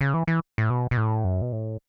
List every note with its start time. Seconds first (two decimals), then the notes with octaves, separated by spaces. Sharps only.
0.01 C#3
0.14 E3
0.27 E3
0.58 A2
0.70 B2
0.91 B2
0.97 A2
1.24 F#2
1.42 B2
1.52 A2